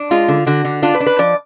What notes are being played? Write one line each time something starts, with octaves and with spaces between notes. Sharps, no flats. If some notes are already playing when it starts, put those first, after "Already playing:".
Already playing: D4
G#3 F4
D3
D3 F#4
D3
D4 F4
B4
D4
B4
F3 D5